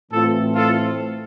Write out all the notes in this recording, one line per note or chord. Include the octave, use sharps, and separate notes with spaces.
A2 E3 A3 C4 F4 A4
F4 A4